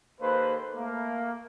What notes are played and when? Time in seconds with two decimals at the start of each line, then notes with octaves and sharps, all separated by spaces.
0.21 D#2 A#3 A4 B4 C5
0.75 A3 A#3